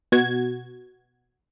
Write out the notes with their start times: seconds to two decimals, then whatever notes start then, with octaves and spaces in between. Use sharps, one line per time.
0.12 B2 F#4 G#6